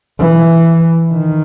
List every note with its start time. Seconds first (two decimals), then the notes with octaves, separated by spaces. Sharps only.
0.19 E3
1.12 D#3